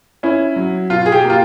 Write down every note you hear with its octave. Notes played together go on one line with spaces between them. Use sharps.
C#4 E4
F#3
B2 F4
G#4
G4
A#3
F4